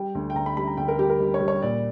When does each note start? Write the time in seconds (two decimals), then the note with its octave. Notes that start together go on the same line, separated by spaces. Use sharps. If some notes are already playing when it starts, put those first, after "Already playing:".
Already playing: G3 G5
0.15 D2
0.30 G5
0.35 D2 A#5
0.46 B5
0.57 G3 B5
0.68 A#5
0.77 D2 G5
0.88 A#4
0.99 G3 G4
1.10 A#4
1.20 G3
1.34 C#5
1.40 G3
1.48 C#5
1.62 A#2 D5